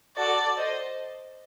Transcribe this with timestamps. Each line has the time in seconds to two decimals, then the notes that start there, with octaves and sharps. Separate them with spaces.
0.17 F#4 A4 D5
0.57 C5 D#5